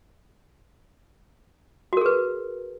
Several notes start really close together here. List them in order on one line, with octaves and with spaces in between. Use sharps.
F#4 A#4 G#4 B4